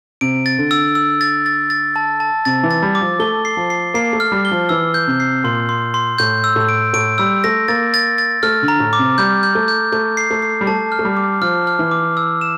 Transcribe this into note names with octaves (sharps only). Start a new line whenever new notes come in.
C3 D7
A6
D3
E6
E6
A6
A6
A6
A5
A5
C3 A6
E3
A6
G3
D6
F3
A3 G7
C7
F3
C7
A#3 C7
A3
F6
G3
G7
F3
E3 E6
G6
C3
C7
A#2 C6
C6
C6
A2 G6
E6
A2
D7
A2 D7
G3 E6
A3 A#6
A#3 A6
A6
A6
A3 F6
D3
A#5
A2
D6
C3
G3 G6
G6
A3
G6
A3 G6
C7
A3
C7
G3
A3 A5
F6
A3
G3
D6
F3 F6
F6
E3
D6
E6
E7